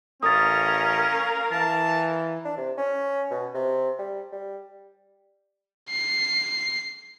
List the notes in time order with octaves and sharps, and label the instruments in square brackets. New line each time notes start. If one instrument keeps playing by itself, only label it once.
[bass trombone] A1 [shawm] C#4 [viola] A#4 F5 [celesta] D#6 A6
[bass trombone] E3 [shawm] A5
[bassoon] D4
C3
C#4
B2
C3
G3
G3
[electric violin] C7